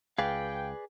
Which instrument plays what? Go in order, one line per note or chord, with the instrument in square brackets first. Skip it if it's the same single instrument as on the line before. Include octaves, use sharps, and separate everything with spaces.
[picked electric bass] C#2 [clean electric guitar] G#4 B4 D5 [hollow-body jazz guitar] F5 [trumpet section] G5